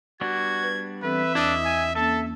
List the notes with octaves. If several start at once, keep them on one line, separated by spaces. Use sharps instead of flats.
G3 B3 D4 F#4 G#6
B4
E3 C4 A4 B4 E5
E2 D4 E4 D#5
G#5
A#3 C#4 A4 E5 A5